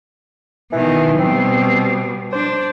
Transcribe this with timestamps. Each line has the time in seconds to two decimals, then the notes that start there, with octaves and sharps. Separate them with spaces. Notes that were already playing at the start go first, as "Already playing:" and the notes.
0.73 B2 D#3 E3
1.19 B2 G3 C4
2.33 D4 C5